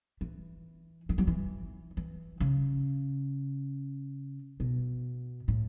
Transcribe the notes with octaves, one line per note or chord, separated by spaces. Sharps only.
E3
E3
F#3
E3
E3
C#3
B2
A2